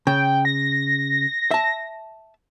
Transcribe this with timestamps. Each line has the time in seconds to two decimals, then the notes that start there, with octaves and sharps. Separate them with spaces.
0.07 C#3 G5
0.45 A#6
1.51 E5 A5